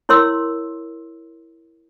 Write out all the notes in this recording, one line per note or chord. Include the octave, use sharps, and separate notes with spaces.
E4 A#4 C#5 C6 E6